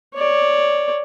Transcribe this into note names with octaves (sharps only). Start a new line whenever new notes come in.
C#5 D5